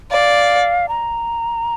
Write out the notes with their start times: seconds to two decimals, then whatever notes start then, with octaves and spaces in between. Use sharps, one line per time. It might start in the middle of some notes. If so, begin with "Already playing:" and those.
0.11 D5 F5
0.89 A#5